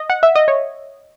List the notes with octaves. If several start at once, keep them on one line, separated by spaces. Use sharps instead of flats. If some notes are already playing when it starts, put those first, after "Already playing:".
Already playing: D#5
F#5
E5
D#5
C#5